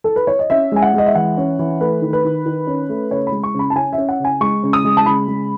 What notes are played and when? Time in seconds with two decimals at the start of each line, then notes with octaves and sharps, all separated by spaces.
0.04 A4
0.16 B4
0.27 C#5
0.39 D#5
0.50 C#4 E5
0.72 G#3 G#5
0.82 F#5
0.94 G#3 D#5
1.06 E5
1.15 E3 F#5
1.37 C#4
1.59 E3
1.80 A3 B4
2.02 D#3
2.13 B4
2.24 D#3
2.46 D#3
2.67 C#4
2.89 A3
3.11 C#3 C#5
3.27 B5
3.32 G#3
3.44 C#6
3.54 C#3 B5
3.70 A5
3.76 C#4 G#5
3.93 E5
3.98 C#4
4.09 F#5
4.19 C#3
4.25 G#5
4.41 G#3 C#6
4.63 C#3
4.73 D#6
4.85 G#3
4.97 A5
5.06 C#3 B5
5.28 G#3